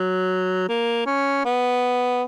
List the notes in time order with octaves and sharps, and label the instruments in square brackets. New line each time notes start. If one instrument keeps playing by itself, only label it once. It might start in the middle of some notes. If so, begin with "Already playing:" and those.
Already playing: [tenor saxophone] F#3
A#3
C#4
B3